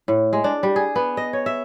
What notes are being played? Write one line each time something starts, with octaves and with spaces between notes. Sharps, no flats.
A2
G#3
D4
G3
G#4
B3
D#5
C#5
E5